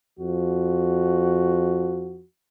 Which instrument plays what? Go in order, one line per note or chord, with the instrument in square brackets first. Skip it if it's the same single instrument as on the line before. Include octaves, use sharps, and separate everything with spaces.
[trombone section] F2 F3 F#4